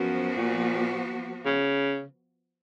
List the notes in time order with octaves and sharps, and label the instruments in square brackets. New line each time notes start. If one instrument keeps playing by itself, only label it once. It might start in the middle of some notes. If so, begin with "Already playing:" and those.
Already playing: [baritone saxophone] F#2 [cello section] F3 B3 F#4
[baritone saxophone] A#2
C#3